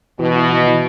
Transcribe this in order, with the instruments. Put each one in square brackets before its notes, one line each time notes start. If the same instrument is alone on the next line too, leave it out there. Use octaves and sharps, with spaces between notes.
[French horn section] B2 [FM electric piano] E3
[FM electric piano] E4
E3
E3